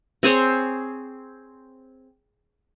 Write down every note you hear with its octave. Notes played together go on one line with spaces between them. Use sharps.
C4 G#4 C5 C#5